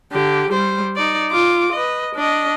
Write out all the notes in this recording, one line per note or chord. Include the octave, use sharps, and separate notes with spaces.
D3 G4
G3 C5
D#4 D5
F4 D6
B4 D#5
D4 D#5